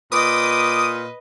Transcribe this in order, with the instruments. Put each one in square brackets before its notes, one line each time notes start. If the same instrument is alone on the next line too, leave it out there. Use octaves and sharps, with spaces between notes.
[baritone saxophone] A#2 [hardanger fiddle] B4 D#5 [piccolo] D6 [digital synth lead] D#6